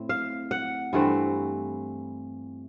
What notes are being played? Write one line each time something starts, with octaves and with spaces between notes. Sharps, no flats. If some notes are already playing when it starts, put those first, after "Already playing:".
Already playing: A2 C4
F5
F#5
G2 E3 A3 C4